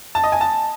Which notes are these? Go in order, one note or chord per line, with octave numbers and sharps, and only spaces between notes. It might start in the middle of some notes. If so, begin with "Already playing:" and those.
A5
D#5
G#5
A5